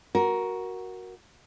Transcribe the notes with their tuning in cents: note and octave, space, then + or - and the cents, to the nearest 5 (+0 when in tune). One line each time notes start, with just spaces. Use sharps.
F#4 +0 A#4 +10